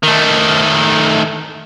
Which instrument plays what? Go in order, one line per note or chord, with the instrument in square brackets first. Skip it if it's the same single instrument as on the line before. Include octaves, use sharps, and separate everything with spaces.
[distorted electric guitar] D#3 A3